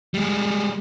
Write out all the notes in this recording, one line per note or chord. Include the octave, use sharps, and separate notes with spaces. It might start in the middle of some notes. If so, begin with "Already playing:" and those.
G3 G#3